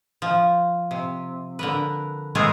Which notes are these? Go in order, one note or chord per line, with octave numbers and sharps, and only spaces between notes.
F3
C3
D3 A#4 B4
G#3 A3 B3 C4 G#4 A#4